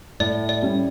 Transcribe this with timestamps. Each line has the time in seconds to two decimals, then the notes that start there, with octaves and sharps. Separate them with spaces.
0.20 A2 D5
0.49 D5
0.62 G3 C#4